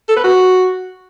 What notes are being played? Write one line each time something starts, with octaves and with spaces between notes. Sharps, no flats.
A4
B4
F#4